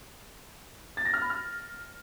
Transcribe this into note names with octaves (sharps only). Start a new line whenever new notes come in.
A6
A#6
F6
B5
F6